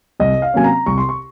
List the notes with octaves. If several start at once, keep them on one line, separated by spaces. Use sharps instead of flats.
C2 D#5
F5
C3 F#3 A#3 C#4 G#5
A#5
C2 C#6
C6
C#6